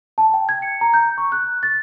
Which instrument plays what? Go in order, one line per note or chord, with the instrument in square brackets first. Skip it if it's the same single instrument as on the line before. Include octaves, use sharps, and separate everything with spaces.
[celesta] A5
G5
G#6
C#7
A#5
G6
C#6
F#6
A6